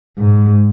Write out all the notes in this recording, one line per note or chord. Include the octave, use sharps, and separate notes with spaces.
G#2